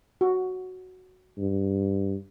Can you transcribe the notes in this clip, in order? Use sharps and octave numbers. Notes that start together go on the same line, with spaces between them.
F#4
G2